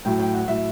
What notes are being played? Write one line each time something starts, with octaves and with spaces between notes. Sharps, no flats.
A2 F#3 G5
G5
F#5
A2 F#3 E5